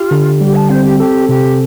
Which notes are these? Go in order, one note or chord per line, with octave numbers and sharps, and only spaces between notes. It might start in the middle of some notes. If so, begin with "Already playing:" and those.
Already playing: F4 G4
D3
G3 G4
A5
C4 C5
G4
G4 A4
C3 G4